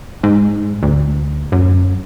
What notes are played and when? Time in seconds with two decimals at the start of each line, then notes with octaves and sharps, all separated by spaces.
0.23 G#2
0.83 D2
1.52 F#2